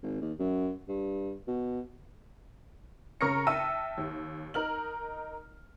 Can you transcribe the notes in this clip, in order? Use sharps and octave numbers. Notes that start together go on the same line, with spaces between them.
G#1
D#2
F#2
G2
B2
C#3 A#4 C#6 F6 A#6 C#7
E5 G5 A5 E6 D#7
D#2
D#4 A#4 F6 F#7